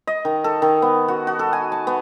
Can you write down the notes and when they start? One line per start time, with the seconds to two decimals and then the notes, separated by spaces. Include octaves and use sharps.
0.07 D#5
0.25 D#3
0.44 A4
0.62 D#3
0.82 B3
1.08 F#4
1.27 F#4
1.39 A4
1.53 G#5
1.72 A5
1.87 B3